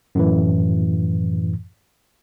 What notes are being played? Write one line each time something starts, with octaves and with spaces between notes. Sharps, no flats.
F#2 A2 E3